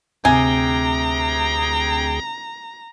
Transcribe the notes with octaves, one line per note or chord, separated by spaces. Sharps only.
D2 C3 G#4 G5 G#5 A#5